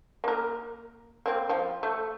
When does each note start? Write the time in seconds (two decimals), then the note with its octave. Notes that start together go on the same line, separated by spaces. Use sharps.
0.24 A#3 A#4
1.26 A#3 C4
1.49 F3
1.83 A3